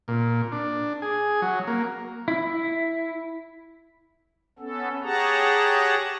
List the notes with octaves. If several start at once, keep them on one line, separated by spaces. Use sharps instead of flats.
A#2
D4
G#4
F#3
A#3
E4
B3 C#4 A4
G4 G#4 C#5 F#5 A5 A#5